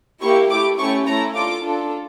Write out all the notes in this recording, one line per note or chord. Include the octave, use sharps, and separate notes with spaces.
A#3 E4 G4 C#6
A3 E4 G4 D6
A3 C#4 E4 G4 C#6
A3 E4 A4 A#5
D4 F4 A4 D6
D4 F4 A4